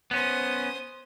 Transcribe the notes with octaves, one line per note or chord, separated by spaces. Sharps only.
B3 C#4 C5 D#6